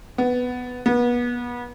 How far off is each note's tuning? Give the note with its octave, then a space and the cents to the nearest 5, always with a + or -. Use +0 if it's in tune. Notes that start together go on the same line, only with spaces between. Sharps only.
B3 +5
B3 -30